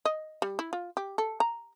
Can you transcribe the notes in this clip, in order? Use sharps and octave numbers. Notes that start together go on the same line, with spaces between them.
D#5
G3
E4
F4
G4
A4
A#5